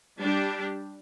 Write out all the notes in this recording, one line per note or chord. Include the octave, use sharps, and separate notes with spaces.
G3 D4 G4